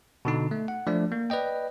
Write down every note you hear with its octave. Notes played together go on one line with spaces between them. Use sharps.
B2 D3 D#4
A3
F#5
F3 A3 D4 D5
A#3
B4 D5 D#5 G5